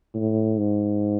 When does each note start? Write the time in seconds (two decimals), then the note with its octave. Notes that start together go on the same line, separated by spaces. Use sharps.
0.14 A2
0.58 G#2